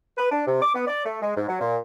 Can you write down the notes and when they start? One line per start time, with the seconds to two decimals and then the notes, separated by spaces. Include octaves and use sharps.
0.17 B4
0.31 D4
0.47 C3
0.62 D6
0.74 B3
0.87 D5
1.06 A3
1.22 G#3
1.36 G#2
1.49 F#3
1.61 A#2